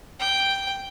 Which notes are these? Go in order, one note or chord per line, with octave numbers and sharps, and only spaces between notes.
G5